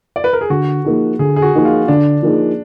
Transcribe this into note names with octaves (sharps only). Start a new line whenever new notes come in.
D5
B4
A#4
G#4
D3 F#4
F3 A#3 D#4 G#4
D3 G#4
G#4
F#4
F3 A#3 D#4 G#4
F4
D3 D4
F3 A#3 D#4 G#4